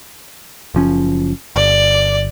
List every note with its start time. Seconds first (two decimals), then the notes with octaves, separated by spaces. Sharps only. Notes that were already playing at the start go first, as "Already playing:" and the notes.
0.74 F#1 F3 C#4
1.56 G1 D5